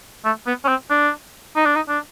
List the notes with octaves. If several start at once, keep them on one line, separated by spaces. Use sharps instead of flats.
A3
B3
C#4
C4
D4
D#4
D4
D#4
D4